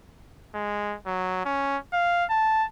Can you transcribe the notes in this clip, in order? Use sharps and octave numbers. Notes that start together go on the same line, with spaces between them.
G#3
F#3
C#4
F5
A5